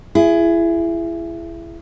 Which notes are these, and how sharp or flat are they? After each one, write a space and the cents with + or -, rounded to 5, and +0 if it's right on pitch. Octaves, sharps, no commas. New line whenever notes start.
E4 +25 G#4 +0